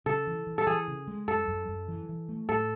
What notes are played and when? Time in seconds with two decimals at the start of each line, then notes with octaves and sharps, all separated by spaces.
0.06 C#3 A4
0.27 E3
0.47 E3
0.58 A4
0.67 E3 G#4
0.88 C#3
1.08 G#3
1.28 F#2 A4
1.48 F#2
1.68 F#2
1.88 E3
2.09 E3
2.29 A3
2.49 A2 A4